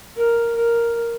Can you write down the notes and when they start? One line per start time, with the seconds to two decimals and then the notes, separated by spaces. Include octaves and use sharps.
0.16 A#4
0.56 A#4